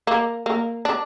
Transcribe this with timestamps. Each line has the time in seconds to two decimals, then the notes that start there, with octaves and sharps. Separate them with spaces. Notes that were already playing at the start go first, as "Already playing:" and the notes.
0.07 A#3
0.46 A#3
0.85 D4